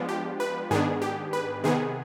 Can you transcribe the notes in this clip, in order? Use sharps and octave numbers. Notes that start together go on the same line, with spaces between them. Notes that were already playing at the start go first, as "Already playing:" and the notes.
Already playing: F3 G#3 B3 D4 F4
G4
B4
G#2 D#3 B3 D4 G#4
G4
B4
C3 D#3 B3 G#4